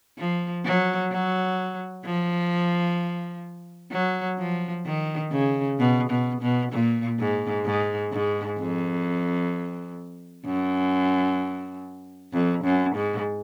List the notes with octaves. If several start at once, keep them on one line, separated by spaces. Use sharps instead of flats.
F3
F#3
F#3
F3
F#3
F3
D#3
C#3
B2
B2
B2
A#2
G#2
G#2
G#2
F2
F#2
F2
F#2
G#2